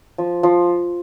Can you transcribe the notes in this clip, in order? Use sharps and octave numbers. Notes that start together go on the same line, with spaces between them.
F3
F3